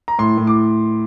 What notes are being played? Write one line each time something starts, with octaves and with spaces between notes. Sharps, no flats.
A#5
A2 C6
A2
D6